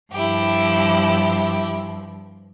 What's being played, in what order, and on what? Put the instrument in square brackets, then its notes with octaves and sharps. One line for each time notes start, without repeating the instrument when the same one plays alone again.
[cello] G2 F3 [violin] E4 G4